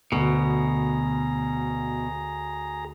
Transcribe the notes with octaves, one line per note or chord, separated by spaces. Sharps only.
D2 B2 G#4 A#5